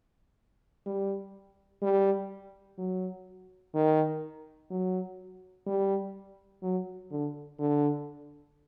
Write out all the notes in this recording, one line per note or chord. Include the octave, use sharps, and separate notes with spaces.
G3
G3
F#3
D#3
F#3
G3
F#3
D3
D3